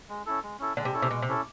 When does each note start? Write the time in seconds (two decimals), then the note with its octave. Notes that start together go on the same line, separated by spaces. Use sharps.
0.09 G#3
0.26 C#4 E4 A4
0.43 G#3
0.59 C#4 E4 A4
0.77 D3 G#3
0.85 C3
0.93 C#4 E4 A4
1.02 C3
1.11 B2 G#3
1.22 C3
1.28 C#4 E4 A4